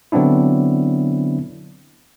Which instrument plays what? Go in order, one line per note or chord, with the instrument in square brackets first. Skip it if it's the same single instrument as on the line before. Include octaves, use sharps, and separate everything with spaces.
[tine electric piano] D3 F#3 B3 C4 D4 E4